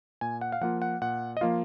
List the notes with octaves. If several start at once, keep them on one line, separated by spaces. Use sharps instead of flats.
A#2 G#5
F#5
F5
F3 A#3 F4 F#5
F#5
A#2 F#5
D#5
F3 A#3 F4 F5